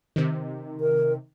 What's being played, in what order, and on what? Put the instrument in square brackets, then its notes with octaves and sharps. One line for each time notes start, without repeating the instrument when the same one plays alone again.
[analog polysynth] C3 D#3
[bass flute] A#4